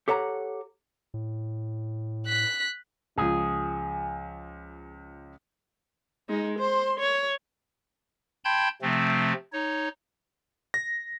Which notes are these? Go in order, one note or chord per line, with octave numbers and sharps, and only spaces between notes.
G4 A4 C#5 F#5 A#5
A2
F#6 B6
C#2 F3 G#4
G#3 D#4
C5 C6
C#5
G5 A5 B5 C6 G6 G#6
C3 F3 A3 C4
D#4 C#5
A#6